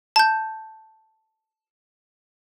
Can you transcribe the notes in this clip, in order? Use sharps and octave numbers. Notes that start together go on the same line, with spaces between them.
A5 G6